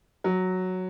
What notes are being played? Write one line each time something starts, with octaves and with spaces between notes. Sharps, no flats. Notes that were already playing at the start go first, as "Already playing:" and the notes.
F#3